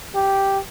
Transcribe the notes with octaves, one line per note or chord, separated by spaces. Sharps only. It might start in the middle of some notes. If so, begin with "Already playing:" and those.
G4